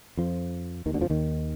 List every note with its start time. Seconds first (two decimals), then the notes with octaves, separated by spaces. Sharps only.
0.17 F2 F3
0.86 D#2 D#3
0.94 D2 D3
1.01 F2 F3
1.10 D#2 D#3